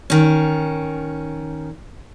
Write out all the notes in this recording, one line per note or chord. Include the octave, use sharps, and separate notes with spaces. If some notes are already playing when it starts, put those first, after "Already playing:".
D#3 C#4